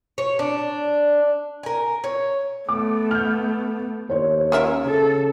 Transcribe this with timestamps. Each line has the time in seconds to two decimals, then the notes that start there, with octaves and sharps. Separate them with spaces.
0.18 C#5
0.39 D4
1.63 A#4 G#5
2.04 C#5
2.69 A3 B3 D6
3.11 F6 G6
4.10 D#2 C5 C#5
4.52 C#4 F4 A#4 E5
4.85 C#3 A4